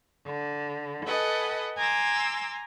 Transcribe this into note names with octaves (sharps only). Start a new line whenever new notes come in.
D3
A4 B4 D#5 F#5 G#5
G#5 A#5 C6 D6 E6